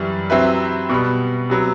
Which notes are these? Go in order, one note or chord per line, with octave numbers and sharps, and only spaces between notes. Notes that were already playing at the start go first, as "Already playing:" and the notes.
Already playing: F#2 E3 G3
C3 F#3 C4 E4 B4
B2 G3 B3
C3 F#3 B3